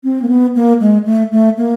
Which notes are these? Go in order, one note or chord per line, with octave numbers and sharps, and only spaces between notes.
C4
A#3
B3
A#3
G#3
A3
A3
A#3